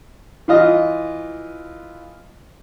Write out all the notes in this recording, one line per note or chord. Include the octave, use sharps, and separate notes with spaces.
E3 F4 D#5